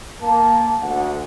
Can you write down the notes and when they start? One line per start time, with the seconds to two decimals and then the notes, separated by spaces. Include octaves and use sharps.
0.22 A#3 A5
0.81 D2 F#5